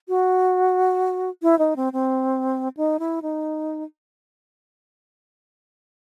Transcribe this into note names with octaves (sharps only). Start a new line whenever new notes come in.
F#4
E4
D#4
C4
C4
D#4
E4
D#4